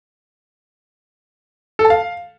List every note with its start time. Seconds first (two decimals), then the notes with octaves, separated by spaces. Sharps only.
1.79 A4
1.85 A5
1.90 F5